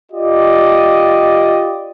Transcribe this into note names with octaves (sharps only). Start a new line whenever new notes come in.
F4 G4 D5 D#5